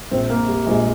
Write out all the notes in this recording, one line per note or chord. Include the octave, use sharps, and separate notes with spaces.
A#1 A#2 C4
A#3
G3
A#1 A#2 G#3